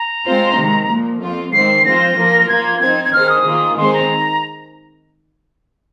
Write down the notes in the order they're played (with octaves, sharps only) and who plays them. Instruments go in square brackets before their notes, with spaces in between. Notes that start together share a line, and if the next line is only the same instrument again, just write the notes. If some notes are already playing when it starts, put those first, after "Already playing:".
Already playing: [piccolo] A#5
[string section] G#3 C4 F4 C5
C3 D#3 G#3
A#2 F3 A#3
F2 F3 C4 F4
[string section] G#2 D#3 G#3 C4 [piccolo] C7
[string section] F3 C4 F4 C5 [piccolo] A#6
[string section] F3 A#3 F4 A#4
[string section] F3 A#3 F4 [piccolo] G#6
[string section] F3 C4 D#4 C5 [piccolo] G#6
[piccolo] G#6
[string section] D#3 C4 D#4 G#4 C5 [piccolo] F6
[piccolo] D#6
[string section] D#3 A#3 F4 G#4
[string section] D#3 G#3 C4 G#4 C5 [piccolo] C6
[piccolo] A#5